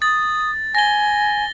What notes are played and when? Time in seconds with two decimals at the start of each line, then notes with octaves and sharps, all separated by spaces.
0.02 D#6 A6
0.75 G#5 A#6 G7